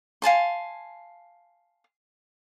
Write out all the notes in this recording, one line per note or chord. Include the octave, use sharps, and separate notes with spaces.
F5 G#5 A5 C6